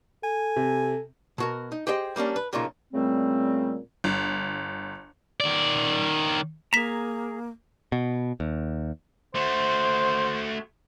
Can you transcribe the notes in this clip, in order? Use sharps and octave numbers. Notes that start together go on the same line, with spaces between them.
A4 G#5
C3
B2 F#4 A#4
D#4
G4 G#4 C5 D#5 G5
G3 A#3 C#4 D4
B4
B1 A#2 C#3 A#3 D#4 F4
A#2 C#3 G3 A3 C4
G1
D#3 D5
A#3 G#4 A#5 B6 E7
B2
D#2
A3 F#4 C5